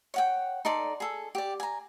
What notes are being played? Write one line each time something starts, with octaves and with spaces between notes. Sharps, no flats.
C#5 F#5 G5
D#4 A4 D5 C6
G#4 A4
G4 D5
G#5 A#5